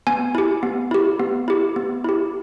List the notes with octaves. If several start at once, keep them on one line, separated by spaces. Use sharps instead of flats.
B3 G#5
E4 G4
B3
E4 G4
B3
E4 G4
B3
E4 G4